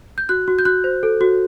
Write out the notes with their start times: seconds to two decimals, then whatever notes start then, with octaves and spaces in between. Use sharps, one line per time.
0.18 G6
0.29 F#4 F#6
0.48 F#4
0.59 G6
0.65 F#4 F#6
0.84 C5
1.03 A4
1.21 F#4